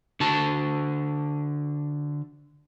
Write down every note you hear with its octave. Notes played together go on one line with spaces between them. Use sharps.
D3 F#4 A5